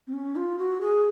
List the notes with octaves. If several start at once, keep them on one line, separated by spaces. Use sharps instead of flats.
C4
C#4
F4
F#4
G#4